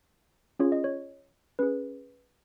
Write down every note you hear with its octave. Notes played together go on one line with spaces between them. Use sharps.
C#4 F4 G#4 C#5
D#5
C#5
C#4 G#4 B4